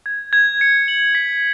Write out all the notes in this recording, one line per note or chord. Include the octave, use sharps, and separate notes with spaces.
G#6
G#6
C#7
F#7
B6